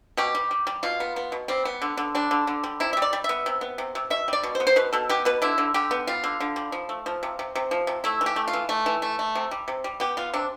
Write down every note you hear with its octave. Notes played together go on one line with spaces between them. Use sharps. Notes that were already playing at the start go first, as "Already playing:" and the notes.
B2 G4
G3
G3
G3
B2 F4
B3
B3
B2
G3 C4
B3
D3
D3
G3 D4
D3
D3
G3
C3 E4
E5
G3
D5
G3
B3 E5
C3
B3
C3
C3
B2 E5
G3 D5
B2
C5
B3
C5
B2 B4
B2 A4
B3 G4
B2 B4
D3 E4
D3
D3 G4
B3
G3 F4
D3
D3
G3
F3
A3
F3
C3
C3
C3
F3
C3
A3 E4
E3
G4
A3
F4
E3
A3
E3
A3
A3
C3
G3
C3
G3
B3 G4
B3 F4
C3 D4